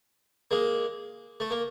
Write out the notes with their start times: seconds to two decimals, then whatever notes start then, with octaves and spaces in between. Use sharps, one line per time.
0.51 G#3 A#3
1.40 A3
1.51 A#3